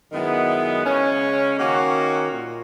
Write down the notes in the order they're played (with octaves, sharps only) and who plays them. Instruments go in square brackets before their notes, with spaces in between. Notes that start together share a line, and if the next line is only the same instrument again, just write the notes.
[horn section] F#2 D#3 G#3 B3 E4
C#3 G#3 C#4
D#3 A#3 C#4 F#4
A#2